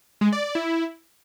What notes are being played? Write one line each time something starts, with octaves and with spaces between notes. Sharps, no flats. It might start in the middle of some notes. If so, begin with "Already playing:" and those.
G#3
D5
D5
E4